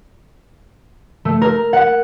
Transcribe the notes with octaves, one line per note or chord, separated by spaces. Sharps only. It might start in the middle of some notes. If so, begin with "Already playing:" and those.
A3
A#4
F#5